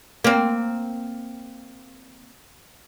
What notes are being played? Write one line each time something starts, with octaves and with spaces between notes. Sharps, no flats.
A#3 C4